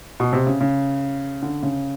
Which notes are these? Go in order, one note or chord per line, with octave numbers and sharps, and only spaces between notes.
B2
C3
C#3
C#3
D3
C#3